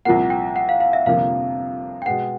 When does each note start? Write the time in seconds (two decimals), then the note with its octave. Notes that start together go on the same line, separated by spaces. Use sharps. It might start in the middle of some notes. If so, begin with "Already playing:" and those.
0.05 C2 A#2 F3 A#3 F#5
0.30 G5
0.56 F#5
0.69 F5
0.80 F5
0.93 E5
1.06 G1 F2 C3 F3 A#3 F5
2.02 G5
2.06 B2 G#3 B3 F#5